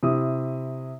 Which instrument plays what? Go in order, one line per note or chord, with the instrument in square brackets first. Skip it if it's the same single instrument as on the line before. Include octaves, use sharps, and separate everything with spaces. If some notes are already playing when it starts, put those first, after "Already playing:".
[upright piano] C3 E4 D#6